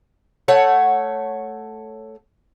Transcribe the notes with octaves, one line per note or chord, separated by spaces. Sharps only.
A3 C#5 F#5